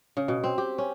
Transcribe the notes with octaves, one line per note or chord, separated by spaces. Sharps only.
C#3
B2
C4
G4
C#4